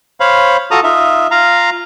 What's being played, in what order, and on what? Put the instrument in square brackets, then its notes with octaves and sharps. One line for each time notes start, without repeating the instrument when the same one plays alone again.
[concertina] C5 C#5 F5 B5
F4 F#4 A4 A#5 D#6
D#4 F4 E5
F4 F5 A#5